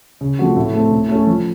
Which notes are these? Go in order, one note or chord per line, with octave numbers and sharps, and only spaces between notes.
C#3
F3 A3 C4 F#4
A2
A3 C4
A2
A3 C#4 A4
F3